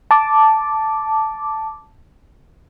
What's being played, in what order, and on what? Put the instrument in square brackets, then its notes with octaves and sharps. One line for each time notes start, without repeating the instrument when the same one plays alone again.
[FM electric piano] A5 D6